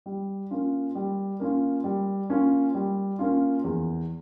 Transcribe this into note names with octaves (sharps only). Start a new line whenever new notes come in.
G3
A#3 C#4 F4
G3
A#3 C#4 F4
G3
A#3 C#4 F4
G3
A#3 C#4 F4
E2